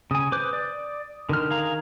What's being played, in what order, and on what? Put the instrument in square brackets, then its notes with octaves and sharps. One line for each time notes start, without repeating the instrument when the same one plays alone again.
[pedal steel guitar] C#3 G#5 [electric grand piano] D#6
[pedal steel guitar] B4 C5 D6
D5
[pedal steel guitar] D3 F6 [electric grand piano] D#3 A#4
[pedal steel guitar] G#4 F5 A#5